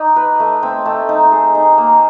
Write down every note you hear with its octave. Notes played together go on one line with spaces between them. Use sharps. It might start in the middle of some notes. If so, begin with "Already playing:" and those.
Already playing: D#4 D5
B4
A3
C4
A3
D#4
G#4
D#4
A#3